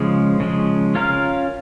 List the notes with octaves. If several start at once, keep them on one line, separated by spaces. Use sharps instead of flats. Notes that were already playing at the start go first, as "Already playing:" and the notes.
Already playing: C#3 F3 G#3
C#3 F3 G#3
C#4 F4 A#4 F5